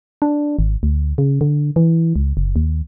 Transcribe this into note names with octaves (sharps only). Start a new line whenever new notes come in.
D4
G#1
D2
C#3
D3
E3
C#2
F#1
D#2